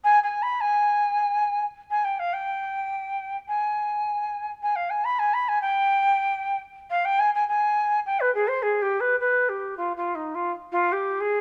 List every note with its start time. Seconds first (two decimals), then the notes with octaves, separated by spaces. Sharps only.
0.04 G#5
0.24 G#5
0.43 B5
0.61 G#5
1.91 G#5
2.04 G5
2.19 F5
2.33 G5
3.48 G#5
4.63 G#5
4.76 F5
4.90 G#5
5.05 B5
5.19 G#5
5.34 B5
5.49 G#5
5.62 G5
6.90 F5
7.05 G5
7.20 G#5
7.35 G#5
7.49 G#5
8.06 G5
8.20 B4
8.35 G#4
8.48 C5
8.63 G#4
8.82 G4
9.00 B4
9.20 B4
9.49 G4
9.77 F4
9.97 F4
10.15 D#4
10.35 F4
10.72 F4
10.92 G4
11.21 G#4